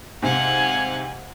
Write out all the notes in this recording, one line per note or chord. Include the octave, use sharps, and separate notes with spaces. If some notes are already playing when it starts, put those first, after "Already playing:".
G#2 C3 F5 F#5 G#5